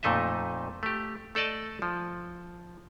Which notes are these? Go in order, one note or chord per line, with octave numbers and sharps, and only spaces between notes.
F2 A#2 A3 D#4 D#5 E5
A3 G4
A3 A4 D5 D#5 A5
F3